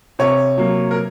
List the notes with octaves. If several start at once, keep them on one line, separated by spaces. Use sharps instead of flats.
C3 C#5
F#3 A#3
A#4